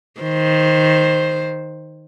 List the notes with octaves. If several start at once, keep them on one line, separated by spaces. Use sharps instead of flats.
D#3 C5